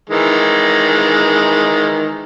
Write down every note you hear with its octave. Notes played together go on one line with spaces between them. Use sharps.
D#3 E3 G#3